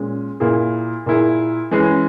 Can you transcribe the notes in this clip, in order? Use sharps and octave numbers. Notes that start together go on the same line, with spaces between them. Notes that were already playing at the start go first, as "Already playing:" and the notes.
Already playing: A#2 G#3 C#4
A#2 A#3 E4 G#4
A#2 A#3 E4 G#4
E3 G#3 C#4 G#4